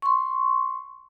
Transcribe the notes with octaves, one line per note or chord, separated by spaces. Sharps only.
C6 C#6